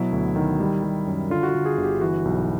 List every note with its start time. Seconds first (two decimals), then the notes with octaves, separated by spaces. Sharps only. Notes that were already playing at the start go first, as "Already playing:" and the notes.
Already playing: B2 F#3 E4
0.12 D2
0.36 D#3
0.60 G3
0.84 G3
1.07 F#2
1.30 D3 F4
1.43 F#4
1.49 F4
1.55 D3
1.65 G#4
1.78 G1
1.84 G4
2.01 E3 F#4
2.25 B1